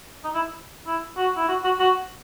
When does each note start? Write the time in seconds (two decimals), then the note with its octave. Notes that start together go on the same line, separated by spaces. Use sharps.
0.24 D#4
0.35 E4
0.86 E4
1.17 F#4
1.36 E4
1.48 F#4
1.64 F#4
1.79 F#4